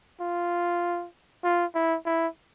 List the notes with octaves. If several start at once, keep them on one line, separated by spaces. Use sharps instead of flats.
F4
F4
E4
E4